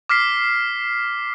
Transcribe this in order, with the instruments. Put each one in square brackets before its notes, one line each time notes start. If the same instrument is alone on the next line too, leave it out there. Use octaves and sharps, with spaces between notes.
[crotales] D6 F6 B6 C7